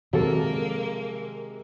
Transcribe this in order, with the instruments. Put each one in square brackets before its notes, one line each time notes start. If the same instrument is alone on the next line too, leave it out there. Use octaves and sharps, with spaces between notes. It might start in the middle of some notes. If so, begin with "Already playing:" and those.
[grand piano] C3 G#3 A#4 [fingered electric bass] D#3 F3 [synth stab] F#3 A4 [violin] A#3